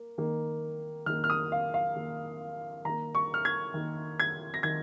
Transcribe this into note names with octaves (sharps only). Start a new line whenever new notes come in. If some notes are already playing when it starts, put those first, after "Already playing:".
Already playing: A#3
D#3 A#3
D#3 A#3 F6
F6
D#6
F5
F5
D#3 A#3
D#3 A#3 A#5
C#6
F6
G#6
D#3 A#3
G#6
A#6
D#3 G#6